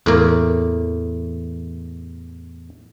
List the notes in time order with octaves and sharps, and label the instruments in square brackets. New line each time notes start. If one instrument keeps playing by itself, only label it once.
[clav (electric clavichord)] E2 [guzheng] A2 A#3